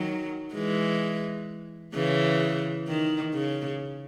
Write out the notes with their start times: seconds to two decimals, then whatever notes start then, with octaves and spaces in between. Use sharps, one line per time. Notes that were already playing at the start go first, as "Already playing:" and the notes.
Already playing: D#3 F#3
0.53 E3 G#3
1.94 C#3 E3
2.87 D#3
3.34 C#3